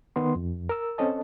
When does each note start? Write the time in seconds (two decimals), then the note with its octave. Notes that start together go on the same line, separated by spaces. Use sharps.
0.16 D#3 B3 C6
0.36 F2
0.69 A#4 E6
0.98 C4 C#4 A4 D#5 A5